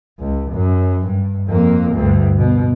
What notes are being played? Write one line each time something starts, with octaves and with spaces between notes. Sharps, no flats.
C#2
F#2
G2
F2 A#3
D2 G2
B2